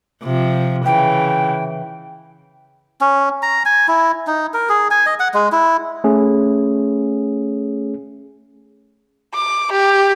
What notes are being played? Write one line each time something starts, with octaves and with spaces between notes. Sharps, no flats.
C3 F3
C#3 E3 G5
C#4
A#5
G#5
E4
D#4
A#4
G#4
G#5
D#5
F#5
G#3
E4
A3 C#4 G#4
D6
G4